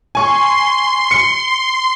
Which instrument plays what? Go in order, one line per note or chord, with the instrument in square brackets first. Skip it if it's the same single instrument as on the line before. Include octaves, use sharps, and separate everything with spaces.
[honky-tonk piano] G#5 C#6 [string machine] C6
[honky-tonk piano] C#7